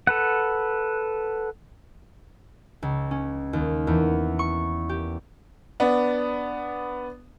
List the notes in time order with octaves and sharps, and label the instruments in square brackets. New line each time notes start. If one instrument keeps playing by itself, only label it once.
[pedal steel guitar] A4 B4 F#5
[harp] C#2
C#4
D#2
E2
C#6
G4
[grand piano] B3 D4